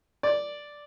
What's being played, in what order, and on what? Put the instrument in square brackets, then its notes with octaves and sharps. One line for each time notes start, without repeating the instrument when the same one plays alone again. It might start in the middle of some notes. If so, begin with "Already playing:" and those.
[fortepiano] D5